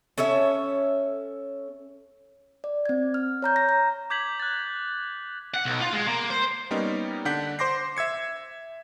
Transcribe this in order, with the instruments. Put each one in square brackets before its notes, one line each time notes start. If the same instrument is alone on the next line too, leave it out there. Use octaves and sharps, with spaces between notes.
[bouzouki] C#4 A4 C#5 E5
[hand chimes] D5
C4 G#6
F6
C#5 A#5 G6
A#6
A#5
[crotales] D6 G6 G#6 B6 F#7
F#6 A6
[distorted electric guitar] F#5
B1
F4
G#3
A#3
C5
[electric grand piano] G3 A#3 B3 C#4 D#4
D3 D4 F#5 G6 B6
C5 C6 D6 A#6 C7
E5 E6 G#6 C#7